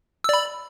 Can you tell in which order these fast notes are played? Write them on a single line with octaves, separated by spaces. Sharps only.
E6 D5 B5